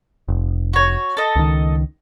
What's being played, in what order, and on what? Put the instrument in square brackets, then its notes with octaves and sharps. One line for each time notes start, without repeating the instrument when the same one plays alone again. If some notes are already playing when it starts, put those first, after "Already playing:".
[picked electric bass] F1
[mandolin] F#4 C#5
A4 D#5
[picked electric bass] C#2 D#3